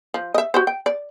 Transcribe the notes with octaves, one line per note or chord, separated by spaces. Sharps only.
F3
D#5 E5
F#4 G4 C5
G5
D5